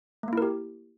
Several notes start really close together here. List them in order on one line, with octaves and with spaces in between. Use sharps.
A3 A#3 E4 A#4 G4